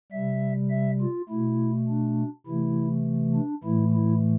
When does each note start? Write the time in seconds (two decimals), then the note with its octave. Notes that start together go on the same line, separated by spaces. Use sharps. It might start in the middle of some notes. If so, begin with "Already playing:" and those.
0.12 C3 G3 E5
0.71 E5
1.01 F4
1.29 B2 A3 E4
1.89 D4
2.47 C3 E3 A3 E4
3.34 D4
3.64 A2 E3 A3 E4
3.94 E4